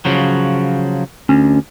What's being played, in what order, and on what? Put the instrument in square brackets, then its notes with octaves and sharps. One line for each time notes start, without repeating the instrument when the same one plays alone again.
[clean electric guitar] C#3 F3 F#3
[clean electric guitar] D2 [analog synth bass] C#4